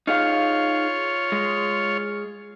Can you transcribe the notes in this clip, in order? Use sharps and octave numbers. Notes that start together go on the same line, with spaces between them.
D#4 F4 G#4 C#5 F5
G#3